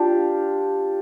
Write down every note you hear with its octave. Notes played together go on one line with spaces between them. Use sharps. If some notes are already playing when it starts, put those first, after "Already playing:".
Already playing: D4 F4 G4